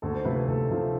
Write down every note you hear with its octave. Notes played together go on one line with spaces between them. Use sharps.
D2 A4
C5
C3 F3 A3 B4
B4
D2 A4
C3 F3 A3